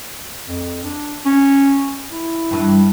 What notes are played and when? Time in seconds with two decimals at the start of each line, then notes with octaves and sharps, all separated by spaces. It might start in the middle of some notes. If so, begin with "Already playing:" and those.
0.47 F2
0.84 D4
1.25 C#4
2.10 E4
2.51 G2 E3